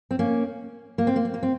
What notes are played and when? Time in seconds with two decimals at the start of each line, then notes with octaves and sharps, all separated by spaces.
0.11 C4
0.19 A#3 C#4
0.98 A#3
1.07 C4
1.16 A#3
1.25 C4
1.34 A#3
1.43 C4